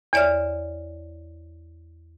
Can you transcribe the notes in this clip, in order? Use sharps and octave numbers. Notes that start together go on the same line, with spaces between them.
E2 C#5 D5 E5 F6